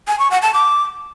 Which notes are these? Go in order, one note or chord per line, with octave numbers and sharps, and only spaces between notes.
G#5
C#6
F#5
A5
D6